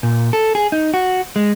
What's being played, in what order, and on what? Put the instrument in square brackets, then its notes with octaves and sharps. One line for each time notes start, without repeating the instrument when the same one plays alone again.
[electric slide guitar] A#2
A4
G#4
D#4
F#4
G#3